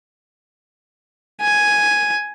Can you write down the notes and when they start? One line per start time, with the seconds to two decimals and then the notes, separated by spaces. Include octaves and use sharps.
1.41 G#5